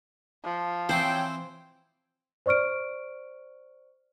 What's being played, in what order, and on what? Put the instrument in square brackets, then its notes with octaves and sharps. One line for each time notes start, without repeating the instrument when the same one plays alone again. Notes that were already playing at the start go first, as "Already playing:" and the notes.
[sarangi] F3
[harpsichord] E3 C4 [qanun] C5 [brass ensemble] C#5 G5
[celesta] C5 D5 C#6 F6 D7